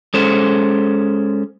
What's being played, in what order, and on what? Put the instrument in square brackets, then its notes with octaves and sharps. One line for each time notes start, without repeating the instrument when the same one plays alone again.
[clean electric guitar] G#3 C#4 A4 C5